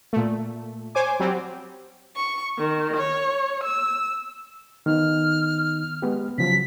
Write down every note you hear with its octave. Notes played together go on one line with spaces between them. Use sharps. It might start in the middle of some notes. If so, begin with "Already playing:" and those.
A#2 A3
C5 C#5 G#5 D6
F#3 G3 C4
C#6
D#3
C#5
E6
D#3 B3 D#4 F6
G#3 B3 G4
C#3 F3 F#3 B6